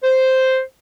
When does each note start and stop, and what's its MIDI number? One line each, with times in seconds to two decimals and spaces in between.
0.04 0.60 72